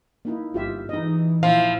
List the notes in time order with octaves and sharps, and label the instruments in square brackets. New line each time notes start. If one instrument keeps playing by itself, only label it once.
[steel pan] A#3 D#4 E4
[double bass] G1 [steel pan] F4 G4 E5
[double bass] E3 [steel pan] D#4 D#5
[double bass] A#2 E4 [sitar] F3 [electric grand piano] F5